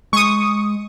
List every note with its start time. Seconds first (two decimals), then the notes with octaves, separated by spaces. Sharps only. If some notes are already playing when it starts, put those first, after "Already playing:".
0.13 G#3 C#6 D#6